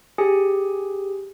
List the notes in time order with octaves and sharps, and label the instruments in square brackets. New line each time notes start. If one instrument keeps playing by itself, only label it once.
[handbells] G4 G#4 G#5